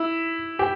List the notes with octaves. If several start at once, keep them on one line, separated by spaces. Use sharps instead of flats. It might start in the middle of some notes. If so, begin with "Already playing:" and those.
Already playing: E4
G4